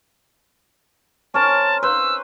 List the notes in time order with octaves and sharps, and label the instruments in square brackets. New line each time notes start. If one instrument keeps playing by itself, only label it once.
[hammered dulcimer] C#4 A#4 C5 [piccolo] A5
[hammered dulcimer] B4 C5 [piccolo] E6